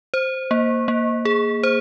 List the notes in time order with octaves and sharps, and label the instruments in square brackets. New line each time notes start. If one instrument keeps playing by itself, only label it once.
[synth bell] C5
A#3
A#3
G#4
C5